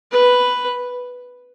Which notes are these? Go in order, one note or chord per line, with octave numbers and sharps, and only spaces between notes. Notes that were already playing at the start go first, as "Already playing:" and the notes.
B4